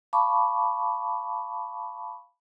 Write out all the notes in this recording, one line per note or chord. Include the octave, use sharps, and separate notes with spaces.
F5 A5 B5 C#6 D6